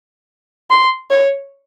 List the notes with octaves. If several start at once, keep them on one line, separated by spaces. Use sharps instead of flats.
C6
C#5